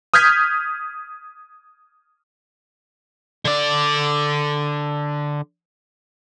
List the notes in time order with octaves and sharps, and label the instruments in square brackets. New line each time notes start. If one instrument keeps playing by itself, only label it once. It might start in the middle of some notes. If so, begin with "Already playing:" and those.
[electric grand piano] D#6 F6 G6 G#6 B6
[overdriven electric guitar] D3 D5